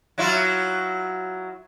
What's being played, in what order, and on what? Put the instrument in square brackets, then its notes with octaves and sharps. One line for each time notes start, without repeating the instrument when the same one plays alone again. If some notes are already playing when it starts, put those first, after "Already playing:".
[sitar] F#3 E4 F4